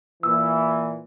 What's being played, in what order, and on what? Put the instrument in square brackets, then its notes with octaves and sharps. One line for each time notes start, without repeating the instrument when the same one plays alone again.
[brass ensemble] A#2 E3 [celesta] E6